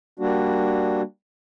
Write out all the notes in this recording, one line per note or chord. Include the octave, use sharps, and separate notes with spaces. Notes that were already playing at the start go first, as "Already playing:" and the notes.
G3 A#3 D4 F#4